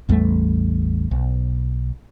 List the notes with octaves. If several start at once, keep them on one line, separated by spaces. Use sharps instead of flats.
A1 E2 G3 A3
B1